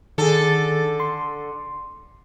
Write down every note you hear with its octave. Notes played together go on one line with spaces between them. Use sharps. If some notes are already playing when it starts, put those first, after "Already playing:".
D3 D#3 G#4 A4
C6